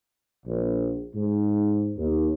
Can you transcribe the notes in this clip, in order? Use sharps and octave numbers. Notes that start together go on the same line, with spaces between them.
A#1
G#2
D#2